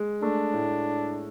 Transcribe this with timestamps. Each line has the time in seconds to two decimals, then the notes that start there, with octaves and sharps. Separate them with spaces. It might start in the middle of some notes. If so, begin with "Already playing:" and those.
Already playing: G#3
0.22 A3 D4
0.54 A2